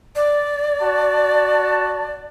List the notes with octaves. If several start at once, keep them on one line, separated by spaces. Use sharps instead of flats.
D5
F#4 A5